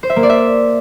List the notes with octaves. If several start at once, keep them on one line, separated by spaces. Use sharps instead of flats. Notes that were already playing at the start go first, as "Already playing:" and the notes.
C5
E5
A#3
D5
E5